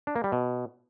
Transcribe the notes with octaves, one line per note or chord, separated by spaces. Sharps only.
D4
A#3
G3
B2